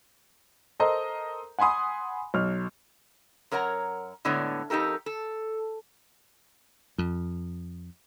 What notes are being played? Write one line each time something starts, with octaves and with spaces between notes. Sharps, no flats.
A4 A#4 C5 D#5 A#5
F#5 G#5 B5 C6 D#6
B1 F6
F#2 A#4 C#5 F#5 A#5
A2 D3 G#3 B3 C#5 D5
F2 D#4 G4 A4 A#4
A4
F2